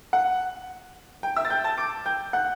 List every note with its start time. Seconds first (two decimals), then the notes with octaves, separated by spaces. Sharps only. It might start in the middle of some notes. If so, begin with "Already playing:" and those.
0.13 F#5
1.23 G5
1.36 E5 E6
1.45 A6
1.50 G5 G6
1.64 A5 A6
1.78 D6 D7
2.06 G5 G6
2.33 F#5 F#6